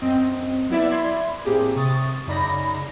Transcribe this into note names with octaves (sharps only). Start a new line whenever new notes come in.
F#2 C4 D#5
F#3 B3 E4 D5 E5
D5 E5 B5 C6 G#6
A2 A#3 C4 G4 G#4
C3 C#6 D#6 A6
F#2 C#3 D#4 D5 B5 A#6